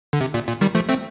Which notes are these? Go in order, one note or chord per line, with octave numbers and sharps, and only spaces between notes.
D3
C3
A#2
A#2
D#3 G3
F3 A3
A3 C4